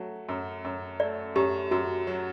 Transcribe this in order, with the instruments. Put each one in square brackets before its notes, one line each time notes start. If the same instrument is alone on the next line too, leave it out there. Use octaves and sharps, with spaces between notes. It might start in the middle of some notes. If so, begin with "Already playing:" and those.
Already playing: [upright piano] F#3 A3
F#2
F#2
[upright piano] A3 [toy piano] D5
[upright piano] F#2 [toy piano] G4
[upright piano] F#2 [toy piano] F#4
[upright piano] F#3